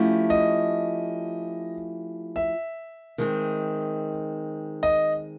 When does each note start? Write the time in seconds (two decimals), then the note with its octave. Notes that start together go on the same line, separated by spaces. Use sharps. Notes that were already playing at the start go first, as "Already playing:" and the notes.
Already playing: F3 A3 C#4 E4 G4
0.30 D#5
2.36 E5
3.18 D#3 G#3 C4
4.83 D#5